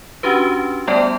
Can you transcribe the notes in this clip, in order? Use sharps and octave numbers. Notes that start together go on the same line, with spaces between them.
C#4 D4 F#4 G4 B4
G3 A3 B3 D5 G5 A5